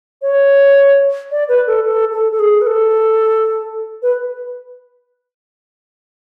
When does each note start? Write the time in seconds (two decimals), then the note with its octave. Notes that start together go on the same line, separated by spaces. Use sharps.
0.22 C#5
1.31 D5
1.49 B4
1.67 A4
1.86 A4
2.12 A4
2.32 A4
2.39 G#4
2.61 B4
2.67 A4
4.03 B4